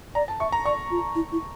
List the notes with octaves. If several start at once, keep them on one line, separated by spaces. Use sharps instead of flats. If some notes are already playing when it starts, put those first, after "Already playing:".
D5 A#5
A5
E5 C#6
A#5
D5 C#6
F4
E4
E4